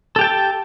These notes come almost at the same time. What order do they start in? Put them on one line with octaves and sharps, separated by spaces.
A4 G4 G5 A5